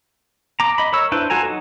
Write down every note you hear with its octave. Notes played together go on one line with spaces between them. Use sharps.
A#5 D6
D#5 B5
A#4 C#5 E6
D4 E4 B4 C5
F4 F#4 A4 G#5 A#5
F#3 D#4